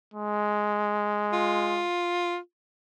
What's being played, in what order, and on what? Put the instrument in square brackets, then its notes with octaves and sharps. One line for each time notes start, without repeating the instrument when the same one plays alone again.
[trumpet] G#3
[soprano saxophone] F4